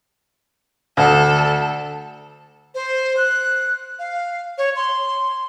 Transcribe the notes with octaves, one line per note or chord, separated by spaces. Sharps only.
D2 A4
C5
F#6
F5
C#5
C6